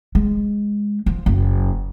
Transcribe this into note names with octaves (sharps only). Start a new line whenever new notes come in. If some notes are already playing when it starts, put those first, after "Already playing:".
G#3
F3
F#1